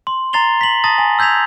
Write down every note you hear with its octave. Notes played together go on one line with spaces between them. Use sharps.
C6
A#5 C6 A6 C7 F7 G7
B6 F#7
A5 A#5 D#6 A6 A#6
G#5
E6 G6 G#6 B6 F7